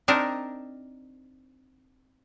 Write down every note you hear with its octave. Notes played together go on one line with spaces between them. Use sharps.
C4 D4 D#4 A#4